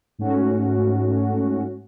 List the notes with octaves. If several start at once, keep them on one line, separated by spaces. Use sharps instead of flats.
G#2 A3 C#4 F#4